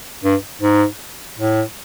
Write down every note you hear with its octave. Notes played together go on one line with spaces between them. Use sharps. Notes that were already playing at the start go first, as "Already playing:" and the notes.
G2
G#2
A2